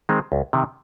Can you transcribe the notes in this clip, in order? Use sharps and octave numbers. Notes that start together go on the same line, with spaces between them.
D#3 G#3 C4
C#2
C3 D#3